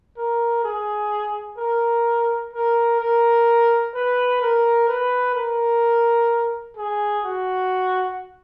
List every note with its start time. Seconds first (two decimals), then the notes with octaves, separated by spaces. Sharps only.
0.17 A#4
0.64 G#4
1.58 A#4
2.53 A#4
3.00 A#4
3.94 B4
4.41 A#4
4.88 B4
5.35 A#4
6.77 G#4
7.24 F#4